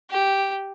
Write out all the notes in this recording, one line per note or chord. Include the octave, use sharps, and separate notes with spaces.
G4